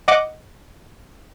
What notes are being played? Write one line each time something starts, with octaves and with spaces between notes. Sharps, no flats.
D#5 F#5 D6